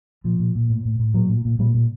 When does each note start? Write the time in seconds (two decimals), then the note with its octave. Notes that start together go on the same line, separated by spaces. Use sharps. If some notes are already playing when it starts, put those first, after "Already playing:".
0.24 A#2 F3
0.39 A#2
0.55 A#2
0.70 A2
0.85 A2
0.99 A2
1.14 A#2 F#3
1.30 A#2
1.45 A#2
1.59 A#2 G3
1.74 A#2